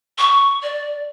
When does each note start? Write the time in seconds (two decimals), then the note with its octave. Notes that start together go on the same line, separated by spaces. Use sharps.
0.18 C#6
0.63 D5